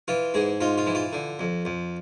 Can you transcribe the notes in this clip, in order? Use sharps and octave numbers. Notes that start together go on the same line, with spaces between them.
E3 F4
G#2 G#4
G#2 F4
F4
E3
F4
D3
F2
F2